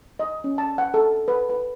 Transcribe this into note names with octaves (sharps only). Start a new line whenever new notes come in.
D#5
C#4
A5
F#5
A4
B4
B4